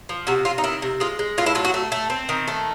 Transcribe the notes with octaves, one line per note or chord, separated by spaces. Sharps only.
F3
C3 F#4
C3 F4
D#4
D#3 E4
C3
G#3 F4
G#3
A2 F4
E4
F#3 F4
F#4
A3
A3
C4
D#3
A3